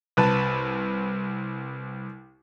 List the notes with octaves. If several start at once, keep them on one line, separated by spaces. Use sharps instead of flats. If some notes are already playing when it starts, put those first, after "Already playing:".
C2 B4 A5